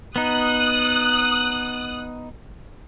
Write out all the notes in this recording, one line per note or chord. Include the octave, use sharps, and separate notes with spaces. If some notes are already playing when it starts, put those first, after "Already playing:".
B3 D#4 D#6 F#6